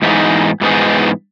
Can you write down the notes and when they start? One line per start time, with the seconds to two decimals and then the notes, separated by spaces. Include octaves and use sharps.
0.02 G#2 E3 B3 D#4 G#4
0.61 G#2 E3 B3 D#4 G#4